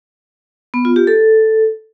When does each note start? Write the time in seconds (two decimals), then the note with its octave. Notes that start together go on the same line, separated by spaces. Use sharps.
0.74 B3
0.85 F4
0.96 G4
1.07 A4